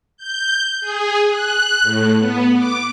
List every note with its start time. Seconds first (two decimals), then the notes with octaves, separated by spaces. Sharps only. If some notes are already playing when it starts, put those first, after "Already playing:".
0.17 G6
0.81 G#4
1.30 F#6
1.83 A2
2.20 B3
2.56 D6